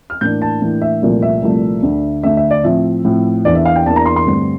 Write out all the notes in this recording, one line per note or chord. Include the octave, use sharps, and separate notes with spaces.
F6
A2 E3 A#3 D4 G6
A5
A2 E3 A#3 D4
E5
C2 A#2 F3 A3
E5
C2 A#2 F3 A3
D2 D3 A3
D2 D3 A3 E5
E5
D5
A2 F3 C4 E5
A2 F3 C4
E2 E3 A#3 D4 D5
E5
F5
G5
E2 E3 A#3 D4 A5
A#5
C6
C6
G2 D3 A3 C4